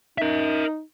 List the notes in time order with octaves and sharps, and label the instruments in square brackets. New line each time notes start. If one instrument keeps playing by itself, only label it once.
[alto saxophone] D#4 [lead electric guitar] A#4 E5